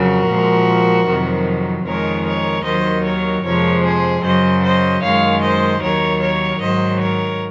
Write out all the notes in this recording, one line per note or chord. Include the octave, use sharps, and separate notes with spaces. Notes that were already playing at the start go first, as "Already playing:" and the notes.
Already playing: F2 C#3 F#3 F#4 A#4
A#2 F3 G#3
F2 C3 D#3 F#3
F2 D#3 G#3 A#4 C#5
A#4 C#5
D#2 D#3 F#3 C5 D#5
A#4 C#5
F2 C3 F3 G#3 A#4 C#5
G#4 C5
F#2 C#3 F#3 C5 D#5
C5 D#5
F#2 D#3 G#3 C#5 F5
C5 D#5
D#2 D#3 F#3 A#4 C#5
A#4 C#5
G#2 D#3 F#3 C5 D#5
A#4 C#5